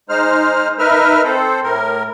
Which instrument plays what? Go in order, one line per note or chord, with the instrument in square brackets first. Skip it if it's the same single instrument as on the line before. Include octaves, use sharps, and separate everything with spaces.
[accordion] G#3 D#4 C5 F6
D#4 A#4 B4 E5 F6
C4 A4 C5
A2 A#4